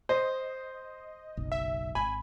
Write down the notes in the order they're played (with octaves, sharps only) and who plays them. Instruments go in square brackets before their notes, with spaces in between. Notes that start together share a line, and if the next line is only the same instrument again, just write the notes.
[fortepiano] C5 [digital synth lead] D#5
[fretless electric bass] F#1 B1
[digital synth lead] E5
[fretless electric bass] G#1 [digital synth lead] G#5 [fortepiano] B5